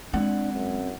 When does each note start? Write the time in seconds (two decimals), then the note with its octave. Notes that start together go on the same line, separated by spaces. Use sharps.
0.14 G#3 C4 D4 E4 F#5
0.53 F#2